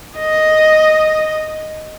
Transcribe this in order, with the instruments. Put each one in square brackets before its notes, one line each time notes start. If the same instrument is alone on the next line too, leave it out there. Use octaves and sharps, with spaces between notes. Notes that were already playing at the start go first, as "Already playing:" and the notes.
[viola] D#5